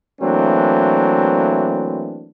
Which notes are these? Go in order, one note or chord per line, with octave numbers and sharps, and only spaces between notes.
E3 F#3 A3 A#3 C4 D4